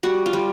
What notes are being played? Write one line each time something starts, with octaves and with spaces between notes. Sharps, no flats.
G3 F#4
F4
G3